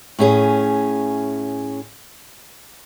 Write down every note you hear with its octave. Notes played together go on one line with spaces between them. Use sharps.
A2 C#4 G#4